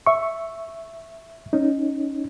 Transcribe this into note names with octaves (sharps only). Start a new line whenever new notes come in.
E5 C#6
C#4 D#4